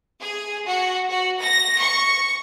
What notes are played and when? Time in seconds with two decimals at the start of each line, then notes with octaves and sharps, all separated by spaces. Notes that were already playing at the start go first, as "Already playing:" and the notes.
0.21 G#4
0.67 F#4
1.09 F#4
1.40 A#6
1.80 C#6